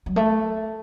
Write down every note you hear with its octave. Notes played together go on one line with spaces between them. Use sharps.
F#3
A3